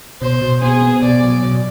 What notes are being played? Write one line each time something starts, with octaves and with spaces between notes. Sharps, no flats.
B2 C5
B2
B3 G#4
B3
B2 D5
F#3
B2